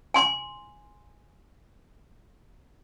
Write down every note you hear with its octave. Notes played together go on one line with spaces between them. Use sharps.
G#5 C6